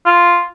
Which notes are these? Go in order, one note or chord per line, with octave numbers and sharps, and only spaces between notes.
F4